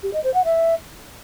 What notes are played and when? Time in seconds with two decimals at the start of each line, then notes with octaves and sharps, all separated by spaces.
0.03 G4
0.13 D#5
0.24 C5
0.34 F#5
0.44 E5